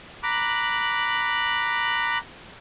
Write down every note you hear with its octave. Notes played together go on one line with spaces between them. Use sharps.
A#5 B5 D6 F#6